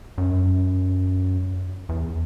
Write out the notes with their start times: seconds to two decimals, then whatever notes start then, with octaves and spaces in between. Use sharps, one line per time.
0.18 F#2
1.89 E2